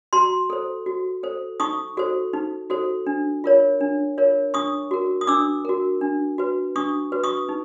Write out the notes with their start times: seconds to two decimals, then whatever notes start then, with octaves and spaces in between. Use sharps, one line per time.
0.13 F#4 A#5 C6
0.50 A4 C5
0.86 F#4
1.23 A4 C5
1.60 D#4 C#6 D#6
1.97 F#4 A4 C5
2.33 D#4
2.70 F#4 A4 C5
3.07 D4
3.44 F4 A#4 C#5
3.81 D4
4.18 F4 A#4 C#5
4.54 D4 C#6 D#6
4.91 F#4 A#4
5.21 D#6
5.27 D4 D6 E6
5.65 F#4 A#4
6.01 D4
6.38 F#4 B4
6.76 D4 C#6 D#6
7.12 F#4 B4
7.24 C#6 D#6
7.49 D#4